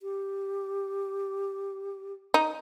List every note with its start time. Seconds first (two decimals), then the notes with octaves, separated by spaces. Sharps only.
0.02 G4
2.34 D#4